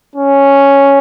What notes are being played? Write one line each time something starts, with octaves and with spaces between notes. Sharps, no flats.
C#4